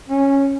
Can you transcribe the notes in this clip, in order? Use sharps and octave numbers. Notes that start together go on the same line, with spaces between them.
C#4